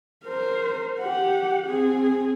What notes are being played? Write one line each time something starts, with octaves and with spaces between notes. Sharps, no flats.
A#4 C5
G4 F#5
C4 G#4